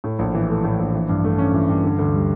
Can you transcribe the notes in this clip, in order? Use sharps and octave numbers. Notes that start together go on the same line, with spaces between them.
A2
A#1
E3
A3
A2
A#1
E3
G2
A3
C#4
E3
G2
D3
D2
G3